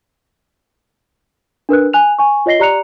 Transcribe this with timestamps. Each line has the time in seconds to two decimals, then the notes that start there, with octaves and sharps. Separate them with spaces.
1.69 D4 A#4 B4 F#6
1.93 G#5 F#6 F7
2.19 G#5 C#6
2.46 F4 C#5 D#5 A#6 C7 G7
2.60 G4 D5 A#5 F#6 C#7 F7